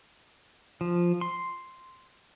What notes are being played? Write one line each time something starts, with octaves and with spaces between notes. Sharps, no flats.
F3
C6